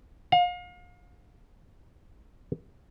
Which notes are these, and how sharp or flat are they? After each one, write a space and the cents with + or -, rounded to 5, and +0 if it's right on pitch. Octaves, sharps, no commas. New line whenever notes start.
F5 +35